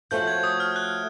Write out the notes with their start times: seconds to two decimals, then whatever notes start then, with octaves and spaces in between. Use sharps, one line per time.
0.11 F3 A3 C#4 F#4 G6
0.27 G#6
0.43 D#6
0.60 F6
0.76 F#6